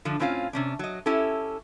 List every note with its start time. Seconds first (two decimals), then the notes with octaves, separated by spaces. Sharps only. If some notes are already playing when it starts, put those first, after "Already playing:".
0.05 D3 F3 D4
0.20 A2 C4 C#4 F4 A#4 F5
0.53 C3 C#4 D4
0.79 F#3 D#5
1.06 C#4 E4 G4 A4